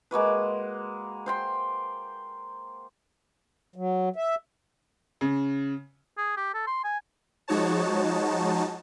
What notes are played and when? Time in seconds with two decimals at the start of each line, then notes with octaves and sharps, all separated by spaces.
0.11 G#3 A#3 F#4 B4
1.26 C5 G5 C6
3.76 F#3
4.16 E5
5.21 C#3
6.18 G#4
6.37 G4
6.54 A4
6.67 C6
6.84 G#5
7.48 F3 G#3 D#4 F#4 C#5 A5